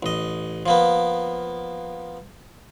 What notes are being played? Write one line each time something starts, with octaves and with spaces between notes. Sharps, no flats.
A1 D#5
F3 A#3 B3